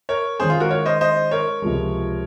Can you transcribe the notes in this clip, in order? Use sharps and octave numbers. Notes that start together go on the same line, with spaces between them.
A#4 C#5
D#3 G#3 C#4 G#4 C5
F4
F#4 A#4
A#4 C#5
C5 D#5
C5 D#5
A#4 C#5
C#2 C3 F3 G#3